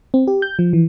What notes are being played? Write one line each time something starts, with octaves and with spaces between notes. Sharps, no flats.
C4
G4
G6
F3
E3